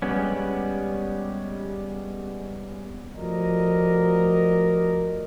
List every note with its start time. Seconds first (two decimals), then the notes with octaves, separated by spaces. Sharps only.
0.02 G3 G#3 B3 C#4
3.16 F3 A3 F#4 A#4 D5 D#5